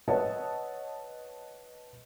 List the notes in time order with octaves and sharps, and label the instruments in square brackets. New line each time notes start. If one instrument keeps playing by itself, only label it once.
[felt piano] B4 C#5 D#5 E5 F#5 A5